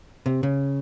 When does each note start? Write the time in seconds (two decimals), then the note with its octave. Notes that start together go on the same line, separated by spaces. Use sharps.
0.26 C3
0.43 C#3